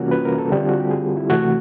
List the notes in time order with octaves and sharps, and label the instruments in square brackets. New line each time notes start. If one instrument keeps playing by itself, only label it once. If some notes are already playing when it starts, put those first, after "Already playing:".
Already playing: [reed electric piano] C3 E3 G3 A#3 C#4 F4 F#4
B4
A#4
A4
D3 G3 C4
F4
F#4
G4
G#4
E4
C3 E3 A3 F#4